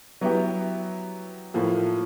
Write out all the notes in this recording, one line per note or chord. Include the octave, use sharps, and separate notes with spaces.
F#3 B3 E4 G4
A2 F3 A#3